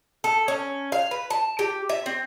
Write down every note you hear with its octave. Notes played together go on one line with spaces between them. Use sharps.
A4
C#4
F5
B4
A5
G4
E5
C4